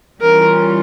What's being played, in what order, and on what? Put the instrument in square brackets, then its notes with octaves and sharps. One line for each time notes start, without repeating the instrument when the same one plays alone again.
[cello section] E3 G3 C#4 F4 [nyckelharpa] A#4